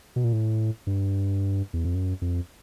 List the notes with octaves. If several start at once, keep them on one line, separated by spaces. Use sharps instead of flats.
B2
A#2
A2
G2
E2
F2
F#2
F2